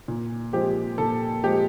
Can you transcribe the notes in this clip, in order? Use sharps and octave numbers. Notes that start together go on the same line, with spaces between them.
A#2
F3 G#3 C4 G4
A#2 A4
F3 G#3 C4 G4